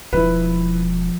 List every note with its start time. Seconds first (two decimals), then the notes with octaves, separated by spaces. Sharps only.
0.13 E1 F3 E4 B4